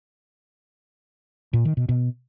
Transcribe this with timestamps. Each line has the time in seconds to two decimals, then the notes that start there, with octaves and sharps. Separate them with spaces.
1.53 A#2
1.65 D#3
1.77 B2
1.89 B2